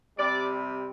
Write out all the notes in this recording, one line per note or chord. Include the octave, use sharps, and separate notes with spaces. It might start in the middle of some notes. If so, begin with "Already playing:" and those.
C3 G3 D5